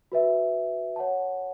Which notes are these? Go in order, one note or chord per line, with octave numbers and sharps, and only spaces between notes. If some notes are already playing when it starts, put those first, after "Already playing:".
F#4 B4 E5
C#5 F#5 A5